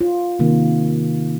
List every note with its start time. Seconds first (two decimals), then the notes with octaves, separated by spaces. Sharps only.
0.01 F4
0.39 C3 D#3 A#3